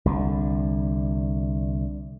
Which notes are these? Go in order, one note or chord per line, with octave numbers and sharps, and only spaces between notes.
C2 D3